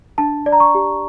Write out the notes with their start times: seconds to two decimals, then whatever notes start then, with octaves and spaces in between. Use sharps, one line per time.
0.18 D4 A5
0.46 D5
0.52 A#5
0.60 C#6
0.75 G4